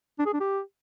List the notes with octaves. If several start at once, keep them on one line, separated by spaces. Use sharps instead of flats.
D4
G#4
D4
G4